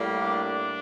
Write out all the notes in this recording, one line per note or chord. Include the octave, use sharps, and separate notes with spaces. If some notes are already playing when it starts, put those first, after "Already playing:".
Already playing: A2 G3 A#3
D4